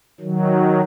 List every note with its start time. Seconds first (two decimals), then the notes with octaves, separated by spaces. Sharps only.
0.21 D#3 F#3